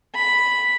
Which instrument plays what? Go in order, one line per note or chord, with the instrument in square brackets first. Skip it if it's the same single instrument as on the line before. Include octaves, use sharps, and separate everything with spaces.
[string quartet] B5